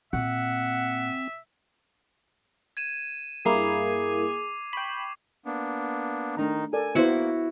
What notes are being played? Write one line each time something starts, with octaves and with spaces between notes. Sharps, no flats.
A#2 C4 E5 F#5
G#6 D#7 E7
G2 A#3 E4 G#4 D6 C7
G5 B5 C#6
A#3 B3 D4
D#3 A3 D4 D#4 A#5
A4 A#4 D5 G#5
A#3 B3 E4 F#4 C5